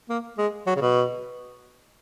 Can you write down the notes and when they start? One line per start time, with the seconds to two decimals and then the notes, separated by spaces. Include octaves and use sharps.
0.09 A#3
0.38 G#3
0.67 F#3
0.76 C#3
0.81 B2